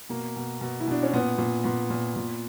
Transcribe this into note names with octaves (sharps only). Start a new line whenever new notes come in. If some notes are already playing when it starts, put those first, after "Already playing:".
B2 A#3
B2
B2
E4
B2 D4
C#4
A#2 B3
A#2
A#2 B3
A#2
A#2